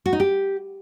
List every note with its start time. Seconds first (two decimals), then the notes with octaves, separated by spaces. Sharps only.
0.06 F#4
0.13 D#4
0.20 G4